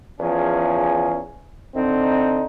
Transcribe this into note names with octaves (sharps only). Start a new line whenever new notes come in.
E2 F3 C#4 G#4
D3 C4 D#4